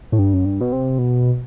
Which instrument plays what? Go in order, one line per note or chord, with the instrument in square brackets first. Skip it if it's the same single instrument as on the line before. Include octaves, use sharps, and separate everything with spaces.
[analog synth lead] A2
G2
F#2
G2
B2
C3
B2